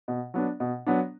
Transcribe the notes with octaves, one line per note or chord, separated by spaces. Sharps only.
B2
F#3 B3 D4
B2
F#3 B3 D4